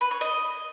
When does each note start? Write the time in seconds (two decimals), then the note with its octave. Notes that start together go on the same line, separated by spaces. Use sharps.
0.01 B4
0.11 C#5
0.21 D#5